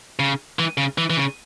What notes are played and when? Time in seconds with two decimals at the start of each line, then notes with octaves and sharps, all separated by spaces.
0.19 C#3
0.59 E3
0.78 C#3
0.98 E3
1.10 E3
1.17 C#3